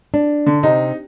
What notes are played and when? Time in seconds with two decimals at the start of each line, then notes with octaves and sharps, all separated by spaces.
0.14 D4
0.46 D3
0.63 C3 D#4